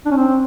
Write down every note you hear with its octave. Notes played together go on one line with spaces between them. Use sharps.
D4
C#4
C4